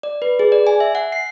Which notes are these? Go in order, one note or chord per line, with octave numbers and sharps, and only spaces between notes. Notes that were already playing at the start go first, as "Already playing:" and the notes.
D5
B4
G#4
D5
G#5
E5
F#5
C7